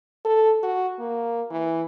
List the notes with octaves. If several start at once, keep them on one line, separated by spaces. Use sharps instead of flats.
A4
F#4
A#3
E3